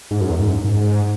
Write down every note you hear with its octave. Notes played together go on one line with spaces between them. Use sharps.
G#2
F#2
E2
G#2
F#2
G#2